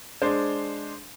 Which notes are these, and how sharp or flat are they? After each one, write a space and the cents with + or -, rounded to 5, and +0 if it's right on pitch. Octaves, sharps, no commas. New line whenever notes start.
G#3 +0 D4 +0 C5 +0